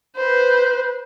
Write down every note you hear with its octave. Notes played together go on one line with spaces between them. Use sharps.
B4 C5